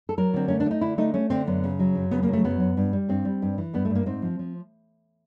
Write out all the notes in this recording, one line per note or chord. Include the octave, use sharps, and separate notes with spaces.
A4
F#3 A#4
D3 C4
A3 C#4
D4
A3 D#4
D3 E4
A3 D#4
A3 C#4
D3 C4
F#2 B3
C#3
F#3
F#2
C#3 B3
A#3
F#3 A3
F#2 B3
F#2
G2
G3
G2 C4
G3
G2
E3
G2 B3
A3
G2
A#3
G#2 C4
F3
F3